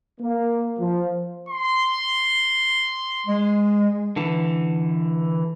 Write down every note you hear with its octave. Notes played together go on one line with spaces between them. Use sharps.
A#3
F3
C6
G#3
D3 E3